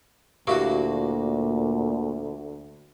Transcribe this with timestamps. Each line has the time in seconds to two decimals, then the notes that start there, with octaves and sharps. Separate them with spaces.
0.47 D2 A#2 A#3 E4 F#4 G4 F5 C#6